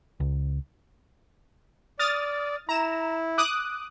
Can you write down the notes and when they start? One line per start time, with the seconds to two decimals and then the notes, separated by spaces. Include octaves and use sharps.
0.20 C#2
1.99 D5 D#6 F6 A6
2.69 E4 A#5 E7
3.38 D6 D#6 F#6